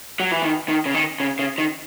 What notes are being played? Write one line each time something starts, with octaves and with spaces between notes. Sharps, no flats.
F#3
E3
D#3
D#3
C#3
D#3
C#3
C#3
D#3